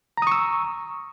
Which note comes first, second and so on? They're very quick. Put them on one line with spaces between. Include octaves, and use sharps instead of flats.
A#5 D#6 C#6 E6